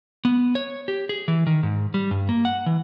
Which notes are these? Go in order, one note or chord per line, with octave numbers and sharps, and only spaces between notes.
B3
C#5
G4
G#4
E3
D#3
G#2
G3
G2
A#3
F#5
E3